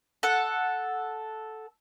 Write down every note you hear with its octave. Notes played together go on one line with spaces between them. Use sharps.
A4 F#5